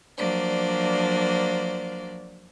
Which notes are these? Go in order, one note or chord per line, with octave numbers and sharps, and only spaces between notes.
F3 F#3 A#3 D4 C5 D5